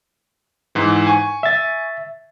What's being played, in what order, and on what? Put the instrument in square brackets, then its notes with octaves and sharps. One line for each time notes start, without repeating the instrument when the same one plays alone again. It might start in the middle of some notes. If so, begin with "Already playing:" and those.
[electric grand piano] G#2 E3
G#5 C#6
[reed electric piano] E5 A6